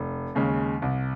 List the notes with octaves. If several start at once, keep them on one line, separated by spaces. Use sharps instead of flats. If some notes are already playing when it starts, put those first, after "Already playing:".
Already playing: F1
D#2 C#3 G#3
C2